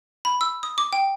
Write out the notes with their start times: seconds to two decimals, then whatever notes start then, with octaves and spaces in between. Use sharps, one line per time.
0.25 B5
0.41 E6
0.63 D#6
0.78 D6
0.93 G5